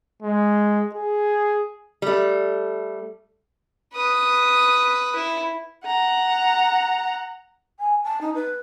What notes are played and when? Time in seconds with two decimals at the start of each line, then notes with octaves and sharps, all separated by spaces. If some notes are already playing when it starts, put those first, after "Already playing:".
0.22 G#3
0.94 G#4
2.02 G3 A3
3.93 B4 D#6
5.15 E4
5.84 F#5 A#5
7.79 G#5
8.04 A5
8.21 D#4
8.35 B4